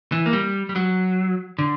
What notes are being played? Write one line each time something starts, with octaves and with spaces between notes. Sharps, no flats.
E3
A#3
G3
G3
F#3
D3